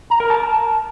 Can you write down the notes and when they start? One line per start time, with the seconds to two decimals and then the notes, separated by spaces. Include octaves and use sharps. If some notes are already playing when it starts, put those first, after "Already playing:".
0.10 A#5
0.20 A#4
0.30 A5